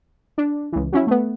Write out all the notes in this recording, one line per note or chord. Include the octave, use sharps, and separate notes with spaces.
D4
C#2 E3
F#3 C#4 E4
A3 B3